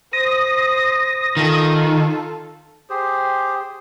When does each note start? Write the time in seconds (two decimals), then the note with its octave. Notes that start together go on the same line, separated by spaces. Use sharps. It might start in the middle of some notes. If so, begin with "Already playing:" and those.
0.13 C5 D#6 A#6
1.37 D#3 F4 A4
2.90 G4 G#4 C5